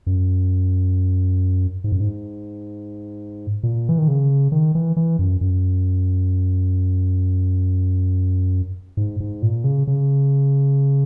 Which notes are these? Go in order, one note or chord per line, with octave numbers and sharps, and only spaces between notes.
F#2
G#2
F#2
G#2
A#2
E3
D#3
C#3
D#3
E3
E3
F#2
F#2
G#2
G#2
A#2
C#3
C#3